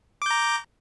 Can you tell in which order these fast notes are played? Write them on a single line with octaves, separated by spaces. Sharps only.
D6 G6 A#5